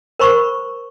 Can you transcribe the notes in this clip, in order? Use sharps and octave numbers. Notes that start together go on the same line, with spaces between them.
A#4 C5 B5 C#6